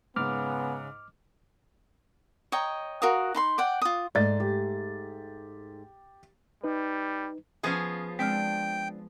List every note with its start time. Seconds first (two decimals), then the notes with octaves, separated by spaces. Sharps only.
0.16 G#2 C#3 B3 D6 F6
2.52 C#5 D#5 G5 A#5
3.02 F#4 A#4 F5 D#6
3.35 D#4 B5 C6
3.58 D5 F#5 G5
3.82 F4 D#6
4.15 G#2 A3 D5 A6
4.40 G4
6.64 G3 D#4 B4
7.63 F3 B3 C#4 G#4 G#5
8.19 G#3 C4 D4 G5 F6